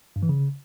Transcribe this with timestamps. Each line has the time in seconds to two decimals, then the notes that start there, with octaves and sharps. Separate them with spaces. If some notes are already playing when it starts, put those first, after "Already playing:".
0.16 G2
0.23 E3
0.29 C#3